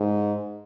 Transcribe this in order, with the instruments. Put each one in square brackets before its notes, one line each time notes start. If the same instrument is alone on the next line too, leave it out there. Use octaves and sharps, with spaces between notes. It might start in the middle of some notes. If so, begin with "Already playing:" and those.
Already playing: [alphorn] G#2